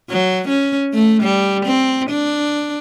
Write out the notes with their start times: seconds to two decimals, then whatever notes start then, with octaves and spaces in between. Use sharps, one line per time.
0.10 F#3
0.49 C#4
0.94 A3
1.23 G3
1.66 C4
2.10 D4